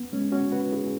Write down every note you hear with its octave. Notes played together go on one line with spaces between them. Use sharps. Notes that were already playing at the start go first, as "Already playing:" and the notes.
Already playing: B3
G#3 C#4
C#4 F#4
F#4 B4
E4 G#4